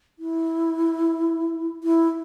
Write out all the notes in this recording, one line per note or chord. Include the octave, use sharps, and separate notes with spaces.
E4
E4